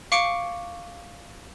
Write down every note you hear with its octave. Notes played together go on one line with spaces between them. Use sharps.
F5 C#6 D6 C#7 D7